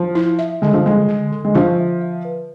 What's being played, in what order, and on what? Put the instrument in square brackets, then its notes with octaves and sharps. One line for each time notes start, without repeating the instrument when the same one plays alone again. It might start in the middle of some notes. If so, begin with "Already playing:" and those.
Already playing: [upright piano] F3
[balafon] E4
E5
[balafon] D3 [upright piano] G#3
[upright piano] F3
[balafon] D3 [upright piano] G#3
[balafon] D3
D3
[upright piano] G#3
[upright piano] F3 [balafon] F4
[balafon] E5
E5
B4